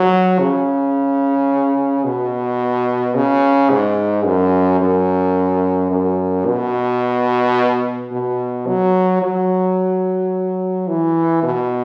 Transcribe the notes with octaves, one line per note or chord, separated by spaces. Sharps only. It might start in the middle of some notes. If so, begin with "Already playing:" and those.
Already playing: F#3
C#3
B2
C#3
G#2
F#2
F#2
F#2
B2
B2
F#3
F#3
E3
B2